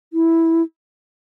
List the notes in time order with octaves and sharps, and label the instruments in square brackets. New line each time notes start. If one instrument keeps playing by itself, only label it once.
[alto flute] E4